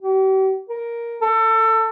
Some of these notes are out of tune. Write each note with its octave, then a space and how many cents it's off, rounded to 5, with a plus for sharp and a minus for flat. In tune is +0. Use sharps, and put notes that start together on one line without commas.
G4 -45
A#4 +5
A4 +25